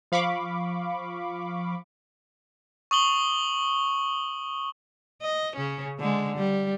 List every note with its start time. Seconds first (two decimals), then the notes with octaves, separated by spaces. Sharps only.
0.12 F3 F5 B5 C#6 D6
2.91 C#6 D#6 F#7 G7
5.22 D#5
5.56 C#3 C#4
5.99 D3 G#3
6.37 G3